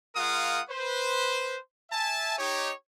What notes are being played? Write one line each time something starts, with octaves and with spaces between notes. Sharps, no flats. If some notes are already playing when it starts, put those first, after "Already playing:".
G#3 F4 A#4 F5 F#5 D#6
B4 C5
E5 G#5 A5
D#4 G4 C#5